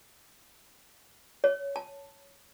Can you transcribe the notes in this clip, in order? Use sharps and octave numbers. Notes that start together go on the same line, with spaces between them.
C#5
A5